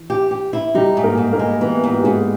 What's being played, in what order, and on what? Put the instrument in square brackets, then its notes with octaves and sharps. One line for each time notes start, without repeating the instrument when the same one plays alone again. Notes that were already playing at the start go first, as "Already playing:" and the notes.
Already playing: [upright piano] E3
[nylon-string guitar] G4
G4
E4
[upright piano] G3 G4 [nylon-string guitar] D#4
[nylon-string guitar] G#2
[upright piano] A#3 A#4
[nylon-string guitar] G#2
[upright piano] A#3 A#4
[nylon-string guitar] G#3
[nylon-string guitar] E3 [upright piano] B3 B4
[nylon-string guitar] G#2
[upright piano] G4
[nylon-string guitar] G#2 [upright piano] G#3 G#4